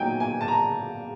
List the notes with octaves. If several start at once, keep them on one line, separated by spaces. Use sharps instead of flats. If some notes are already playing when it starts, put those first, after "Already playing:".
Already playing: A#2 F#3 B3 D#4 G5 G#5
G#5
A5
A#5